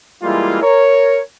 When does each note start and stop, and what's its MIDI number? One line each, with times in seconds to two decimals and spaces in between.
0.23 0.62 52
0.23 0.62 55
0.23 0.62 56
0.23 0.62 58
0.23 0.62 64
0.23 0.62 65
0.62 1.19 70
0.62 1.19 73